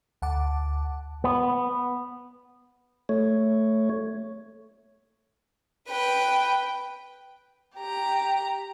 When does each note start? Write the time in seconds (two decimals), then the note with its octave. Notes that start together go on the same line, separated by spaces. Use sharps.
0.22 D2 F#5 A5 D6
1.24 B3
3.09 A3 C#5
5.89 B4 G5
7.76 G4 A#5